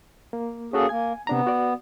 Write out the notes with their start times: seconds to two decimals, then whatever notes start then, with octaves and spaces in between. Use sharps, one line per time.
0.33 A#3
0.73 A#3 C#4 F#4 G#4 A4
0.89 A#3 G#5 G#6
1.27 C3 B3 D4 A#5
1.47 F#4 D5